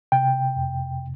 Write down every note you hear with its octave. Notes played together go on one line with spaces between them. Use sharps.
C3 G5
F2